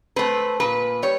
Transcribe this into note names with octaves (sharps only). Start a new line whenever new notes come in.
A3 C4 B4
A#2 B4
G3 C#5